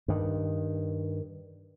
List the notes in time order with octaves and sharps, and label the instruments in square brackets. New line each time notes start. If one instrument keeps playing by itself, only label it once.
[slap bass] G2 D#3